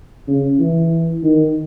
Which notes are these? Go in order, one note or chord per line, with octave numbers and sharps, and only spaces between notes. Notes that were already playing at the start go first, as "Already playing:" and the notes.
C#3
E3
D#3